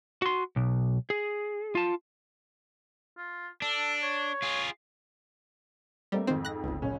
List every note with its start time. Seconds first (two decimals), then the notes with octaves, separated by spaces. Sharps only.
0.22 F#4 C6
0.56 B1
1.10 G#4
1.75 F4 A5
3.17 F4
3.62 D4 A4
4.03 C#5
4.42 F4 G#4
6.12 G3 A3 A#3 C4
6.27 F2 G#2 D#3 C4
6.45 F#6 A#6
6.64 G1 C#2
6.82 F#1 C#3 C#4